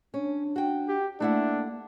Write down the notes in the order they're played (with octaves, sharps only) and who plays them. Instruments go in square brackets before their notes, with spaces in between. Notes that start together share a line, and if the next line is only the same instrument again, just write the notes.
[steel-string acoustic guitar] C#4 [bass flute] D4
[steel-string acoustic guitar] F#4 G5
[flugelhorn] G4
[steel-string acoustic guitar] A3 E4 F#5 [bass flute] A#3 [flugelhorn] D4